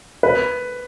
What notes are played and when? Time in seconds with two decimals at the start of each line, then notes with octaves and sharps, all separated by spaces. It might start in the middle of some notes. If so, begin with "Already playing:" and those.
0.23 B4